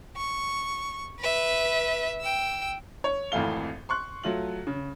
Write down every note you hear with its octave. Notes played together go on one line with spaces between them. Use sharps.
C#6
B4 E5
G5 E6
C#5
G#1 F2 E3 A3 F5 G7
C6 C#6 F#6
F#3 A3 F4 F#7
C#3